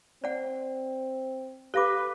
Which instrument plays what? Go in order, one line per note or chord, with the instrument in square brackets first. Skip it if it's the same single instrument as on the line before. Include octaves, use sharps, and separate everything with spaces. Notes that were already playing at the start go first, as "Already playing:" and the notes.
[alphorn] C4 [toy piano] D5 F#5
[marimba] G4 F5 A#6 [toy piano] A4 D6 [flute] B4